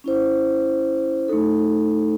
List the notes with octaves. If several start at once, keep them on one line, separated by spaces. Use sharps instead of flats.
C#4 E4 C5
A3 D#4 A4